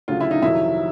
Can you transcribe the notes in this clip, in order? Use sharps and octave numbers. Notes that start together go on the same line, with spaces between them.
D2 C#3 F#3 F4
E4
D#4
F2 C3 D#3 F#3 E4